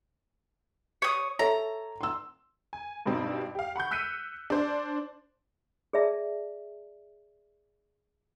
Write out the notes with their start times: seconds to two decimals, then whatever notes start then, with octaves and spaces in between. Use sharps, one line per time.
1.02 C#5 D#6
1.39 A4 C#5 E5 A#5
2.01 C6 E6
2.73 G#5
3.06 G2 B2 G3 C4 D#4
3.55 G4 F5
3.76 F#5 B5 C#6 G6
3.91 E6 F#6 B6 C#7 D#7
4.50 D4 C5 D5
5.93 G#4 D5 E5 A5